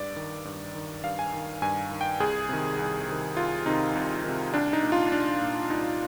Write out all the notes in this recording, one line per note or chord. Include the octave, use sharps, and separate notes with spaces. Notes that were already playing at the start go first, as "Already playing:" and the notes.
Already playing: G2 D5
D#3
G2
D#3
G2 F5
G#5
D#3
G2 G#5
D#3
G5
C2 G#4
C3 D#3
C2
C3 D#3
C2 F4
C3 D#3 D#4
C2
C3 D#3
C2 D4
D#4
A#2
F4
C2 D4
A#2
C2 D#4